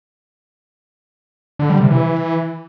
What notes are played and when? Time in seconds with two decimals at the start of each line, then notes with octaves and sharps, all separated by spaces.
1.59 D3
1.70 G3
1.80 C3
1.91 E3